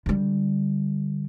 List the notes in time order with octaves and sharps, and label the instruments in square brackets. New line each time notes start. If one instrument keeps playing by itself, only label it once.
[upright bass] D3 G3